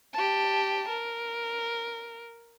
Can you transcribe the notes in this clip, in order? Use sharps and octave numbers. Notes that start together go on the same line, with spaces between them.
G4 A5
A#4